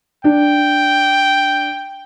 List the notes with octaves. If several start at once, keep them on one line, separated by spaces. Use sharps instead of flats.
D4 G5